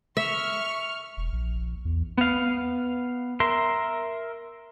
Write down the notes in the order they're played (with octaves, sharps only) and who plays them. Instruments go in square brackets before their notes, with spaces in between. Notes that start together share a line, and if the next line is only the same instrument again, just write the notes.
[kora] E5 [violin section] C#6 F6
[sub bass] E1
A#1
E2
[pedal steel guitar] B3 F5
A#4 E5 C6